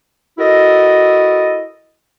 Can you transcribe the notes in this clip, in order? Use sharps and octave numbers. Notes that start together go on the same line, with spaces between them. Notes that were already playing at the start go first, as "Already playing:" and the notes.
E4 F#4 A4 A#4 D#5